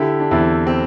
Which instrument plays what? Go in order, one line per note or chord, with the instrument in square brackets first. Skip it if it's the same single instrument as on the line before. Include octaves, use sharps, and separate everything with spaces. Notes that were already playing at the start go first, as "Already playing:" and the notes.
Already playing: [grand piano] D3 E4 G4
D4
E2 C4 E4
C4